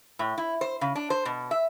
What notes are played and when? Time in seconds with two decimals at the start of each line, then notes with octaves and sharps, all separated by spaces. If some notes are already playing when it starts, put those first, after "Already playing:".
0.19 A2
0.38 E4
0.61 C5
0.81 C#3
0.95 D4
1.10 C5
1.25 B2
1.51 E5